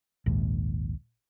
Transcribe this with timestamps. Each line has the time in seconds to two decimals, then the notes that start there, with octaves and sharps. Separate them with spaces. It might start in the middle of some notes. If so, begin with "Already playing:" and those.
0.26 A#1 D#2 G#2